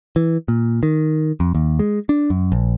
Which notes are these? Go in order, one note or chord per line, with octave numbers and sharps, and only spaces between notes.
E3
A#2
D#3
F2
D#2
G#3
D4
F#2
A#1